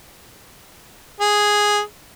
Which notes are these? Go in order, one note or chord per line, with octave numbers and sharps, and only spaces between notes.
G#4